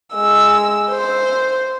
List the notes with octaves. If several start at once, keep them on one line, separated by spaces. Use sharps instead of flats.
G#3 E6
C5